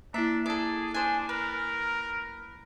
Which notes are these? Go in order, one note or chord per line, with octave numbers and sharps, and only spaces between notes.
A#3 D4 E4 E5
G#4 A4 D5
D4 C5 G#5
A#4 B4